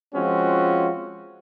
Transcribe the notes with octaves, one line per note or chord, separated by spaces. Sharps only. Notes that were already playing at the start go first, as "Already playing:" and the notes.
F3 G#3 C4 C#4 F4 F#4